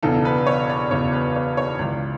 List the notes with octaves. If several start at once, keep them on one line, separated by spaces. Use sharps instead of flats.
E1 E2 C#3 E3 A4
B4
C#5
D5
E1 E2 C#3 E3 C#5
B4
C#5
C#5
C#2 C#3 E3 D5